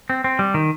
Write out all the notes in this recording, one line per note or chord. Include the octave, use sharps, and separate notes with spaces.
C4
C4
G3
D#3